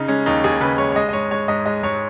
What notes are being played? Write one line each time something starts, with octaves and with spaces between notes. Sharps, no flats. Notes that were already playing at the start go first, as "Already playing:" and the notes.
Already playing: C#3 D#4
G#3 C#4
D#2 D#4
D#2 G#4
C#3 B4
G#3 C#5
C#5
G#3 D#5
D#5
G#2 C#5
G#3 C#5
G#2 D#5
G#3 D#5
G#2 C#5